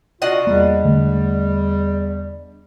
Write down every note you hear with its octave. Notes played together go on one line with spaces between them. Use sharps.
C3 D4 F4 F#4 D#5 F#5
E2 G3 A#3
D3 A3